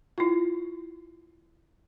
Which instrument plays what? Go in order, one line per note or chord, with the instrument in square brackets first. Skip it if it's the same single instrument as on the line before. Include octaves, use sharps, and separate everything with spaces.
[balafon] E4 F4